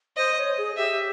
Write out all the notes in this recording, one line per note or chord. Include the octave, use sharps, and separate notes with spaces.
C5 D#5
C#5
G#4
G4 E5